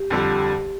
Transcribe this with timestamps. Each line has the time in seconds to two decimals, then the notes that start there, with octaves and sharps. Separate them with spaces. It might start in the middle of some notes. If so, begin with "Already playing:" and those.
Already playing: G4
0.10 F2 D3 G3